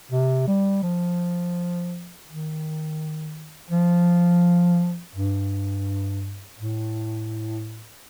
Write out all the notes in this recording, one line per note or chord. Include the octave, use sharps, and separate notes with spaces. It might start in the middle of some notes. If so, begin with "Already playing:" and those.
C3
G3
F3
D#3
F3
G2
A2